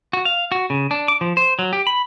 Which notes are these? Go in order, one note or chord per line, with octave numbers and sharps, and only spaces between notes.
F#4
F5
F#4
C#3
D4
D6
F3
C5
F#3
G4
B5